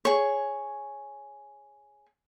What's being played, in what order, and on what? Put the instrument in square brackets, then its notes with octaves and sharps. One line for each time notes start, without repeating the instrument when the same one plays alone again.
[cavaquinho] G#4 C#5